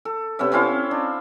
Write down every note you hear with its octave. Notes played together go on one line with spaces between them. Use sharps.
A4
C3 B3 C#4 E5
C4 C#4 E4 F5
D4